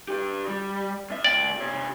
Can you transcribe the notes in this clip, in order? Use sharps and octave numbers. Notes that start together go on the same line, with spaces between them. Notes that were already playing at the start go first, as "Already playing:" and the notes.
D4 G4
G3
G2 E5
C#2 D5 G5
C3 C#5